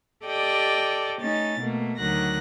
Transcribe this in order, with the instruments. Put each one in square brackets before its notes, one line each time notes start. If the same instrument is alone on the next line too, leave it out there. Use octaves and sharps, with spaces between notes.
[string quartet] G4 A4 D5 D#5 G5
A3 C#4 D#4 A6
B2 A3 A#3
D2 D#3 F#3 F#6 A#6